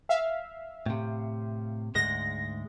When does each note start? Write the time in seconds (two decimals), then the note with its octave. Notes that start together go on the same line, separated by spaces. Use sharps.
0.09 E5 F5
0.86 A2 C3
1.95 D2 G#2 G#3 A#6